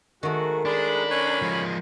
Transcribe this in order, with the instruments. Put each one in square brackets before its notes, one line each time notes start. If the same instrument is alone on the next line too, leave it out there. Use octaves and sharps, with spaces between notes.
[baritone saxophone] G#2 [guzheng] D#3 A3 [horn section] F#4
[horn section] F#2 A#5 B5 [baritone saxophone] G#3 [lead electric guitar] D4
[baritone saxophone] C#4
[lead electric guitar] F3 G#3